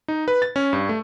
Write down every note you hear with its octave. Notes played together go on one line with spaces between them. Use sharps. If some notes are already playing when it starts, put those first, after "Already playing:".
D#4
B4
A6
C#4
G2
A3